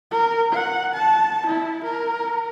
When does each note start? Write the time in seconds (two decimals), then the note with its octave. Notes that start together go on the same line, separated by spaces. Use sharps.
0.11 A#4
0.53 F#5
0.94 A5
1.46 E4
1.84 A#4